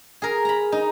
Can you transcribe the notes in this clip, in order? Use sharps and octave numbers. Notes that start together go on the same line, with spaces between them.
G#4 A#4
A#5 B5
D#4